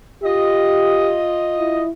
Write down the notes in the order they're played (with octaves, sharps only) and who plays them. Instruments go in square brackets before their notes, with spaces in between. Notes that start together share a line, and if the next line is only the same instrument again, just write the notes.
[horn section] F4 D#5 [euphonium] G4
[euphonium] E4